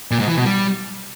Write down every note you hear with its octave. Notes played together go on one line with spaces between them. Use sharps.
A#2
G#2
E3
B2
G3